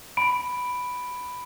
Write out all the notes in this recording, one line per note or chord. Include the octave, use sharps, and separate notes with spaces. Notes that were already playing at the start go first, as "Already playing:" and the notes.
B5 D7